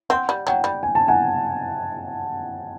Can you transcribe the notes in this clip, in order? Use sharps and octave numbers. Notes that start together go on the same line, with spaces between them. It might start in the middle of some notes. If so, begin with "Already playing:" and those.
C4 F#5
G3
F#3 G5
G3
G#5
A5
F#5 G#5